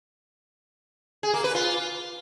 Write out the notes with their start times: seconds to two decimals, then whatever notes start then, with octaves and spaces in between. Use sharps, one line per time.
1.23 G#4
1.34 A#3
1.44 B4
1.55 F4